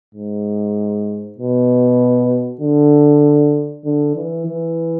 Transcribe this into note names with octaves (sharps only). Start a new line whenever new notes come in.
G#2
B2
D3
D3
E3
E3